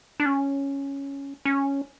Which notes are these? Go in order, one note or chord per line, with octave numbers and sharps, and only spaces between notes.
D4
C#4
C#4